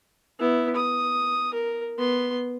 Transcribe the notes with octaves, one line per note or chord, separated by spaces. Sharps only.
B3 E4
D#6
A#4
B3 C6